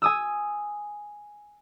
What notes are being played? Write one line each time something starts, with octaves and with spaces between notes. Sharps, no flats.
G#5 D#6 E6